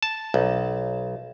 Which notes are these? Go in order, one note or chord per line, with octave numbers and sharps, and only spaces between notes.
A5
B1